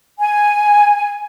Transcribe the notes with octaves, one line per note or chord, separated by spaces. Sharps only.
G#5